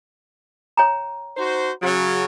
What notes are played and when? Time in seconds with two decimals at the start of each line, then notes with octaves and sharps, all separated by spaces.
0.77 C#5 G5 A#5
1.37 D#4 F#4 C5
1.82 C#3 F#3